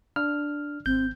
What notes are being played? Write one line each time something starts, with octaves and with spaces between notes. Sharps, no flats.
D4 F6
G#1 C4 G6